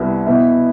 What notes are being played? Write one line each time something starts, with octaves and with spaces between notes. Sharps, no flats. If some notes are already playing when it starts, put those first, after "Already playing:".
Already playing: C2 C3 G3 B3 E4
B2 B3 E4